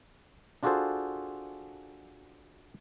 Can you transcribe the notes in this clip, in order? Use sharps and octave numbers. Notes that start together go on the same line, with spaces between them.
D4 F4 F#4 G#4 A4 C5